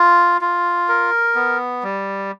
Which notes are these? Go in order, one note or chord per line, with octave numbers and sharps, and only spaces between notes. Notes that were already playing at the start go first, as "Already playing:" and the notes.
Already playing: F4
F4
A#4
B3
G3